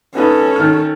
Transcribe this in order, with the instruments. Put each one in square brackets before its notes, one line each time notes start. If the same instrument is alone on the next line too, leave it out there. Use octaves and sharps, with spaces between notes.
[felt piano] B3 D#4 B4 [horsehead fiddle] C#4 A4
[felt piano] D#3 F6